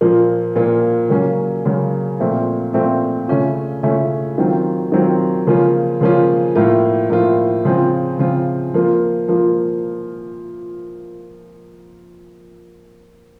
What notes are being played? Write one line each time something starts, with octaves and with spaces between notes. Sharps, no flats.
A#2 F3 A#3 F4
A#2 F3 A#3 F4
C#3 F#3 A#3 C#4
C#3 F#3 A#3 C#4
A#2 F3 A3 C4 F4
A#2 F3 A3 C4 F4
C#3 A3 C#4 F4
C#3 A3 C#4 F4
D#3 F#3 C4 F4
D#3 F#3 C4 F4
C#3 F3 A#3 C#4 F4
C#3 F3 A#3 C#4 F4
A2 F3 A#3 F4
A2 F3 A#3 F4
C#3 F3 C4 F4
C#3 F3 C4 F4
F3 A#3 F4
F3 A#3 F4